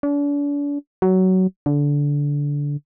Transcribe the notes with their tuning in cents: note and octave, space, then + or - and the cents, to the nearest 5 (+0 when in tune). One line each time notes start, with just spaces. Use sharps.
D4 -40
F#3 +15
D3 -20